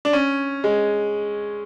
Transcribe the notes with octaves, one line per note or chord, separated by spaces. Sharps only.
D4
C#4
G#3